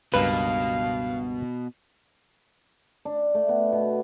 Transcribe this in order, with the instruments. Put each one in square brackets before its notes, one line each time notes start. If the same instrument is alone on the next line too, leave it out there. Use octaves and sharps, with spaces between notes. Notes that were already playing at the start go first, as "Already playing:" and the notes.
[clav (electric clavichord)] C#2 G2 A#3 [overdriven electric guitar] B2 [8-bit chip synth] B4 [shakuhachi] F5
[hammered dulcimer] D4
A3
B3
B2